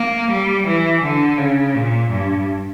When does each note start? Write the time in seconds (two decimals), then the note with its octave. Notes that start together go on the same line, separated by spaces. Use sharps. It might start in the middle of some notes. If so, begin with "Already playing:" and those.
Already playing: A#3
0.31 G3
0.67 E3
1.03 D3
1.38 C#3
1.75 A#2
2.11 G2